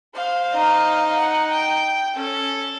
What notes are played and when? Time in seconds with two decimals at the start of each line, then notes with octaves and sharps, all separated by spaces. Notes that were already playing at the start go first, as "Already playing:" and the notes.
0.15 C5 F5
0.55 D#4
1.17 F#5
1.51 G5
2.16 C#4 A4